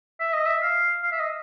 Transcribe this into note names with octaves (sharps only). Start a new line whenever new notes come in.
E5
D#5
E5
F5
F5
E5
D#5